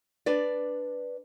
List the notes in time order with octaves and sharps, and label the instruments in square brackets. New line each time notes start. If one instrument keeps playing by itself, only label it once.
[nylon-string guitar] D4 B4 D5